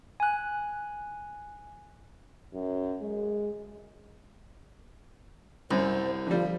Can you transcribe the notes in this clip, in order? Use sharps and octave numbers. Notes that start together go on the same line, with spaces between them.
G#5 F#6
F#2
G#3
C2 F#2 C5
D3 F3 G3